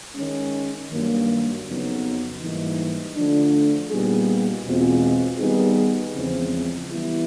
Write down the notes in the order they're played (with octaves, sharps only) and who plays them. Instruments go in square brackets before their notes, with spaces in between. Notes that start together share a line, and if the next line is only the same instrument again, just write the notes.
[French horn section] D#3 G#3 C#4
G2 D#3 F#3 A#3
F2 C#3 F#3 B3 D#4
G#2 E3 G3 A#3 D#4
D3 F3 A3 D4
A#2 G3 B3 D#4 G#4
E2 B2 G#3 C4 F4
D#3 G3 B3 D#4 G#4
E2 C#3 F3 G#3 C4
E3 G3 B3 E4